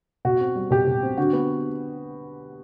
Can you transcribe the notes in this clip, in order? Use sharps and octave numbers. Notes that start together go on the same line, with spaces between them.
B2 F#4
C4
G3
B2 G4
B2
C4
D3 F#4
B3